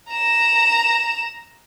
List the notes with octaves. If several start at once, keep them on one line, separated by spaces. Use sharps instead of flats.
A#5 E7